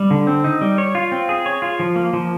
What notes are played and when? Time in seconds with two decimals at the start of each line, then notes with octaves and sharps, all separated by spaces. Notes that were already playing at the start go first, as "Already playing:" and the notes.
Already playing: G3
0.11 D3
0.27 C4
0.44 D#4
0.61 G3
0.78 C#5
0.95 F4
1.12 C4
1.29 G#4
1.46 C#5
1.62 F4
1.80 F3
1.96 A#3
2.13 F3